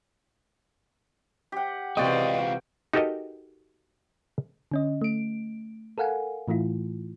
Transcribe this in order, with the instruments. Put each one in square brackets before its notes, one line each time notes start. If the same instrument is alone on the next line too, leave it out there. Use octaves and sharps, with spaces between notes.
[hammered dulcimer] G4 F#5
[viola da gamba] C3 E3 [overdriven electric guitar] G#3 F4 [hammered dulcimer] F#4 G5 [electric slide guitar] D5 D#5
[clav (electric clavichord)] D#4 F#4 G4 A4 A#4 D#5
[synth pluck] D3 C#4 D#5
A3 D7
A4 A#4 F5 F#5 G#5
A2 E3 A3 E4 F4